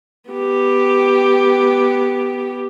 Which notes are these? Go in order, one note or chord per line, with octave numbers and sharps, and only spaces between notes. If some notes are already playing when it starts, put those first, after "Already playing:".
B3 G4